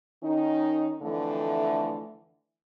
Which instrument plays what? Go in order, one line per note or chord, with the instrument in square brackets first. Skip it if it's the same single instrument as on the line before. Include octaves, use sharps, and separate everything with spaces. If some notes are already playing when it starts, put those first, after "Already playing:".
[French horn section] D#3 C#4 D#4
F2 D3 E3 A3